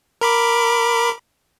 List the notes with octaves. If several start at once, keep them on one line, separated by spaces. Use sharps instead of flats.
A#4 B5 D6